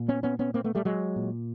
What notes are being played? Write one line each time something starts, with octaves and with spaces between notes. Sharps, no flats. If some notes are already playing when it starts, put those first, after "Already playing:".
Already playing: A#2
B3 C#4
B3 C#4
B3 C#4
A#3 C4
A3 B3
G3 A3
F#3 G#3
A#2